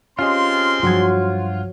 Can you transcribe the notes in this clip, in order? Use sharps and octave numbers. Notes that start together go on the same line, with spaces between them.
C4 C#4 F4 G4 G#4 D#5 C6
G2 F3 F#3 F#4 F#5 G#6